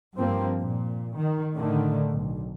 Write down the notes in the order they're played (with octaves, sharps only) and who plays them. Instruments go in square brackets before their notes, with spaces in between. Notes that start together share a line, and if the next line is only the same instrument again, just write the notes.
[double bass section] G2 F3 A#3 C4
A#2
D#3
A2 D3 D#3 A3
B1